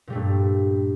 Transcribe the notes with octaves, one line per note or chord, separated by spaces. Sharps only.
G2 A#2 G3 A3